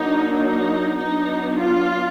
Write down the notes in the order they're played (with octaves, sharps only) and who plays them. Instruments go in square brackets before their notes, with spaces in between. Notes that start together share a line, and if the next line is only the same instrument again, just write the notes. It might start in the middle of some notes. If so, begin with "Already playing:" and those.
Already playing: [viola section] F#3 A#3 D4 D#4
D#4
F#3 B3 D4 D#4
F4